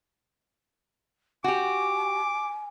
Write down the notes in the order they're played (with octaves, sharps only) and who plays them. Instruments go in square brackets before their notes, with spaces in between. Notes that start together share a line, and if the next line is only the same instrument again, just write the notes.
[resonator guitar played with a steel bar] F#4 G4 [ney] G#5 [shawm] D6